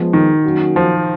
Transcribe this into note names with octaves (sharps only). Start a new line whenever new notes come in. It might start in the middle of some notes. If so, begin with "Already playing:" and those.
Already playing: F3 G#3 B3
D#3
F#3 A#3 C#4 F#4
F3